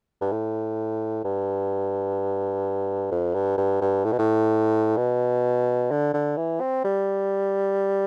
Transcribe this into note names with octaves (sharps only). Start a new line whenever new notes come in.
G2
A2
G2
F2
G2
G2
G2
A2
B2
A2
B2
D3
D3
E3
C4
G3